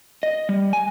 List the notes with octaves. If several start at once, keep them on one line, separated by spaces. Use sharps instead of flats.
D#5
G3
G#5